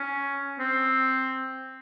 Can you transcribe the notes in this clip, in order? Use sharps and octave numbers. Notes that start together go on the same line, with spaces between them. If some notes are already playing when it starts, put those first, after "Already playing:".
Already playing: C#4
C4